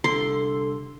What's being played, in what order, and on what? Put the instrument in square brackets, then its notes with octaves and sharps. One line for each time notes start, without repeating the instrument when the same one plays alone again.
[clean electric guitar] C2 D3 [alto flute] A4 [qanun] C6